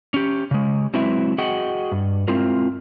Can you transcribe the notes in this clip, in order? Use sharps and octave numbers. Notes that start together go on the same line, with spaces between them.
C#4 G4
C#3 G#3
F#3 G#3 C4 E4 B4 E5
F#4 G#4 D#5 F#5 G5
G2
G#3 C4 E4 F4 A#4